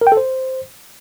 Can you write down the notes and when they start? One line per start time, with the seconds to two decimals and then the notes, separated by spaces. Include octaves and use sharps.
0.01 A#4
0.07 G5
0.12 A4
0.17 C5